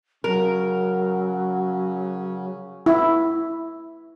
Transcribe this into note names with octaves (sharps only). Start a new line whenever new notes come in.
C#3 F#3 C#4 A#4
E4